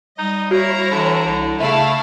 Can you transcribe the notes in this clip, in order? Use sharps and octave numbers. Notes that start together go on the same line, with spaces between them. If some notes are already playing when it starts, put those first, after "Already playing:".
G3 D#4 D#5
A#3 E4 F#4 C#5 A#5
D3 E3
C2 D3
C#3 A3 E4 E5 F5